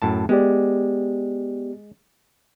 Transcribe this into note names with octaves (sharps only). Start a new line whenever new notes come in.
F#2 A2 A5
G#3 B3 G4 D5